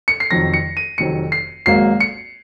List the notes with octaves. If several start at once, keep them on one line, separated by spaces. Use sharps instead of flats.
C#7
C7
F1 F2 D#3 F#3 A#6
C#7
D#7
F1 F2 D#3 F#3 C#7
C7
G#1 G#2 F#3 A#3 C7
C#7